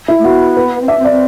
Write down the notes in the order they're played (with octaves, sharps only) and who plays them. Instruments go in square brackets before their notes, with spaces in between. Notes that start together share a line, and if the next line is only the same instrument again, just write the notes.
[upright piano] E4
[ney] A3
[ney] B3 [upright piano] F#4
[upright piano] B4
[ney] C4
[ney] D4 [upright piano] E5
[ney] C4
[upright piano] D5
[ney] C4